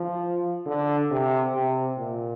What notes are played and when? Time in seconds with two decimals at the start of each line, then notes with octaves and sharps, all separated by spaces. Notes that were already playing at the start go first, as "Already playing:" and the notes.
Already playing: F3
0.66 D3
1.11 C3
1.54 C3
1.97 A#2